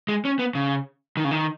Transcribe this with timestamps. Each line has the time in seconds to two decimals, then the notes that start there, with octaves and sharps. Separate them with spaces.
0.09 G#3
0.25 C#4
0.39 B3
0.55 C#3
1.17 D#3
1.24 C#3
1.31 D#3